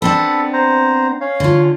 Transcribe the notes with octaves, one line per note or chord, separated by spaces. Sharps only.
B3 C4 D4 A4 B5
C5 A#5
C#4 C#5 F5
D3 F4